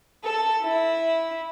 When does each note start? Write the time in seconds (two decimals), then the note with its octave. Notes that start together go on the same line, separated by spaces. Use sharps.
0.22 A4
0.63 E4